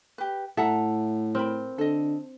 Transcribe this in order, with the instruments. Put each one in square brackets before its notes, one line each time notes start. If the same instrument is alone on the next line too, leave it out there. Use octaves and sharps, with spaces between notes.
[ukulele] G4 B4
[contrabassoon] A2 [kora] A4 [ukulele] E5 F#5 A#5
[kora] C4 [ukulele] A#4 B5
[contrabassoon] D3 [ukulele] A4 D#5